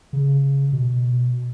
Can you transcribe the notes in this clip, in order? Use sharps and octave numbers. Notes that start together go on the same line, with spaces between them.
C#3
B2